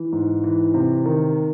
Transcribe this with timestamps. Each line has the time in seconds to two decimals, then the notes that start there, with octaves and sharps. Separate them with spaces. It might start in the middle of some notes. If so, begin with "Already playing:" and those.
Already playing: E3
0.12 G#2
0.44 E3
0.74 C3
1.06 D#3